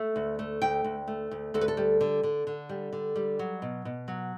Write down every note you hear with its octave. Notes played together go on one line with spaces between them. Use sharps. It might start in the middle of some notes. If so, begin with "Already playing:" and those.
Already playing: A3 E5
D2
A3
D2 G5
D2
A3
D2
D2 A4
B4
A4
G3
D3
D3
D3
G3
D3
G3
F#3
B2
B2
F#3